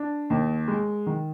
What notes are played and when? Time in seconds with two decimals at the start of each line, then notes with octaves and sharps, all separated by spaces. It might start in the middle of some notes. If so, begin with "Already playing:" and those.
Already playing: D4
0.30 D#2
0.68 G#3
1.06 D#3